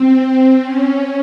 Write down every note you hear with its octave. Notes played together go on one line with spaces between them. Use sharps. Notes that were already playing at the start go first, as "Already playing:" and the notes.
Already playing: C4
C#4